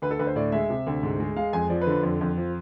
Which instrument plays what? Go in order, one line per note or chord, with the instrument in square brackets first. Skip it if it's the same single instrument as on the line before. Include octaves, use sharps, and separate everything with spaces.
[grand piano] D2 B4
A4
D2 B4
C5
A2 D5
G#3 E5
C3
D2
G#2
G#3
G#3 F5
F2 G#5
F3 D5
B4
D3
B4
F2
F2
F3